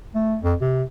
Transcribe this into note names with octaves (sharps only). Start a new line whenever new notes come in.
A3
F2
C3